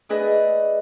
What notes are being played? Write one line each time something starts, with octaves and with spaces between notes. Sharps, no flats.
A3 D4 G#4 B4 D#5